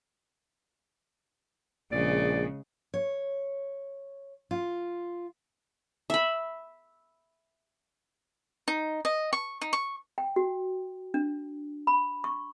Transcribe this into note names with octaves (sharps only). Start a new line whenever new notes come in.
A#1 C#3 G#3 D5
C#5
F4
E5 B5
D#4
D#5
C#6
D#4
C#6
G5
F#4
D4
B5
C#6